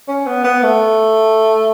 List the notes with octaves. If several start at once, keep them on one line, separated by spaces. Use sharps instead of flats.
C#4
B3
B3
A3